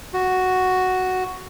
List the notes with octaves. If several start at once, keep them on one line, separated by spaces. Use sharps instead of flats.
F#4